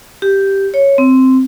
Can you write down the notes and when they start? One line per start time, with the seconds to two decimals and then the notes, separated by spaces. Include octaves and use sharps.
0.22 G4
0.74 C#5
0.98 C4